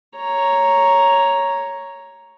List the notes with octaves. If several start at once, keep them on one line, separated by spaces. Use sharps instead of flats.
C#5 A#5